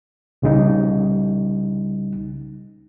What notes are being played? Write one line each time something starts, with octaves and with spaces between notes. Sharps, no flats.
C2 C#3 G3 D#4